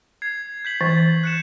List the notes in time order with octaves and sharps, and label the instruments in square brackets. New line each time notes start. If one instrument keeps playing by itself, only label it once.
[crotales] G#6 C7
G6 B6 F#7
[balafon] E3
[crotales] F#6 C#7 E7